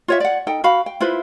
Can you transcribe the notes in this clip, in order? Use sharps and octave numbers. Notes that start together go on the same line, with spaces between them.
F4 C#5 E5
D5 F#5
D#4 A4 G5
F#4 F5 B5
G5
E4 F4 B4 C5